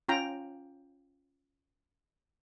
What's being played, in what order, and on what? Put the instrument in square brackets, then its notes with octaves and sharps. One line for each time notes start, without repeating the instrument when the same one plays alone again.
[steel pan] C#4 F4 G5 A#5